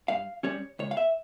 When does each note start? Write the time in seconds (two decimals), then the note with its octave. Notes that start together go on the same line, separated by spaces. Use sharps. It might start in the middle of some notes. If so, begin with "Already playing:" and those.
0.08 G2 F5
0.43 G3 C#4 C#5
0.79 C#2 C#5
0.91 F5
0.97 E5